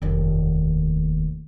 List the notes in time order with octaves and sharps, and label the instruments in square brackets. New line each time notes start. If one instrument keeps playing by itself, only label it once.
[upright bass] F1 D#2